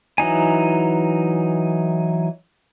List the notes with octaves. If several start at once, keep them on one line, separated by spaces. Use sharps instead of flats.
E3 F#3 D#4 G#5